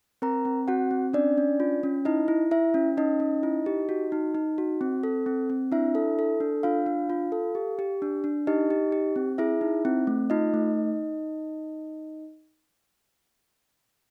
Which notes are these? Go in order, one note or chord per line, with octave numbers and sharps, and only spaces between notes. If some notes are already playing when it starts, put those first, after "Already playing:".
C4 A#4 A#5
C4
C4 F#4 F#5
C4
C#4 D4 D5
C#4
F4
C#4
D#4 E4 D#5
E4
E4 E5
C#4
C#4 D#4 D#5
C#4
E4
G4
F#4
D#4
D#4
F#4
C4
A4
C4
C4
D4 E4 E5
A4
A4
D4
D4 F4 F5
D4
F4
A4
G4
G4
D4
D4
D#4 G4 D#5
G4
G4
C4
E4 G#4 E5
D#4
C4
A3
D#4 F4 D#5
A3